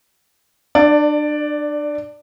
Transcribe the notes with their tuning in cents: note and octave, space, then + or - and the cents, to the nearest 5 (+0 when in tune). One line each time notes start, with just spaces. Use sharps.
D4 +30 D5 +0